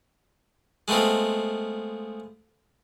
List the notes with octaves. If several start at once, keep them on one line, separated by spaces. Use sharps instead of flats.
G#3 A3 B3 C4 F4